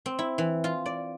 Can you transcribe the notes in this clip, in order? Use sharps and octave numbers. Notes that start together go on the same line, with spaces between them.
C4
E4
E3
F4
D5